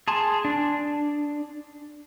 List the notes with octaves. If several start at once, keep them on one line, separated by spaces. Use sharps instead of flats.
G#4 A5 C6
D4